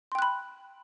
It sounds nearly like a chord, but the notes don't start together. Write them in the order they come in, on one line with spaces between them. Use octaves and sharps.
C6 G5 F#6 B5